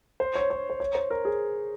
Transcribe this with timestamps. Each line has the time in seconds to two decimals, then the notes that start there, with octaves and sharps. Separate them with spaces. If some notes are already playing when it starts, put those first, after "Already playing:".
0.20 C5
0.35 C#5
0.50 C#5
0.70 C5
0.80 C#5
0.95 C5
1.10 A#4
1.25 G#4